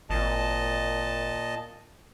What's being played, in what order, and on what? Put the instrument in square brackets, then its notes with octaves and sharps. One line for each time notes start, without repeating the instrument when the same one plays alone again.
[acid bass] G#1 [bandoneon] A#2 D#5 A5